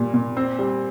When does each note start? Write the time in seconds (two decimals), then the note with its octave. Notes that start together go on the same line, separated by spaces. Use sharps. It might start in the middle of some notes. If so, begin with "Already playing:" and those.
Already playing: A#2 G3
0.14 A#2
0.37 C4
0.59 G3